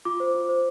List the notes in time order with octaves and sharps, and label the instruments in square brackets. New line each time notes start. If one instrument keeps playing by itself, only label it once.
[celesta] F4 D6
C5
F4
C5